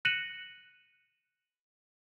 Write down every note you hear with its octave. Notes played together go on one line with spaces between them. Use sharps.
F#6 A#6 C#7 D#7 E7 F#7